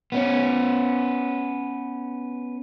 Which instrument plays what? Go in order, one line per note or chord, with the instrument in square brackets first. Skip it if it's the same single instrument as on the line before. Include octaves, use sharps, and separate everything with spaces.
[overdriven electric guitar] B3 C#4